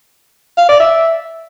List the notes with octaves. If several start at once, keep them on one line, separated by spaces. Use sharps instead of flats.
F5
D5
E5